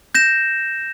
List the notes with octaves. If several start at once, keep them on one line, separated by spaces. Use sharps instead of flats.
G6 A#6 E7